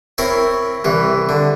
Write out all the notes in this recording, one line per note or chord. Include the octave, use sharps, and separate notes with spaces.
C4 E4 A#4 C#5
C2 E3
D3